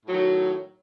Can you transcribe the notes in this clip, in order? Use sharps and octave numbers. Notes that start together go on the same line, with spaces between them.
A2 D#3 F#3